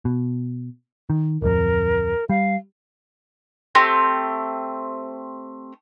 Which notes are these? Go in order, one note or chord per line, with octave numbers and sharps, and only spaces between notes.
B2
D#3
D1 F2 A#4
G3 F5
A3 C4 G4